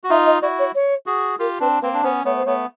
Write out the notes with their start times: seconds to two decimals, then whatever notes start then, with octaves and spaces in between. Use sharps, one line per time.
0.04 F#4
0.09 D#4 F4 E5
0.26 D#5
0.42 E4 F#4 D5
0.59 C#5
0.75 C#5
1.06 F#4 G#4
1.39 F4 G4 A#4
1.60 C4 D4 B4
1.82 A#3 C4 B4
1.94 D4
2.03 B3 C#4 C5
2.25 A3 B3 C#5
2.36 C5
2.46 A3 B3 C#5